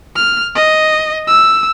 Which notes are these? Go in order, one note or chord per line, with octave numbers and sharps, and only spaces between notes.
F6
D#5
E6